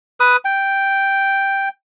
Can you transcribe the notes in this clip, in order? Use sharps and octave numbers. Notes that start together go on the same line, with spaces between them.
B4 D#6
G5